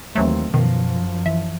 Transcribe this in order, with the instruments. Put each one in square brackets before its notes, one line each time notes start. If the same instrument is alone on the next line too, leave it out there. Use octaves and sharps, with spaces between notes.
[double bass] D#2 C4 [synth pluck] E3 F#3 A3
[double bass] F#2 F3 [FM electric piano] B2 [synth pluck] D#3
[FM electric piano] E3 [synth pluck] E5